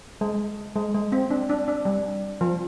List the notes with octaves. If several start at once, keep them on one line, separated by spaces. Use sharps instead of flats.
G#3
G#3
G#3
C4
D4
D4
D4
G3
F3